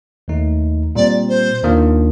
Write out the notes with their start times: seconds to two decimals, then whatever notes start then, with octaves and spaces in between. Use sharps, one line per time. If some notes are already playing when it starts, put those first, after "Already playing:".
0.28 D#2 D#3 A3 D#4
0.95 A#2 G3 C4 D5
1.29 C5
1.63 D#2 D#3 A#3 D4 F4